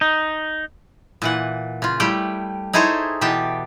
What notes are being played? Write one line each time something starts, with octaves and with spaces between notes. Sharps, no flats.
D#4
A#2 E3 F#5
C#3 F4
G3 A3 E4 G4 G5
D#4 E4 G#4 A4 C5 C#5
B2 E3 G4 G5 A5